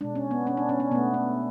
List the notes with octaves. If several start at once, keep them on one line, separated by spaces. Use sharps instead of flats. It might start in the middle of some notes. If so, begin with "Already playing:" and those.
B2 G#3 D4
C#4
B3
C#4
D4
C#4
C#4
B2 A3 B3
C#4